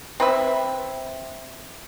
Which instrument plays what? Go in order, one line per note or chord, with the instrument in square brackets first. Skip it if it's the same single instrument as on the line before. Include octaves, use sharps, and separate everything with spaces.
[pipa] C4 B4 E5